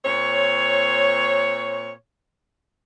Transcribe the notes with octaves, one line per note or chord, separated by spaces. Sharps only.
A#2 C4 C#5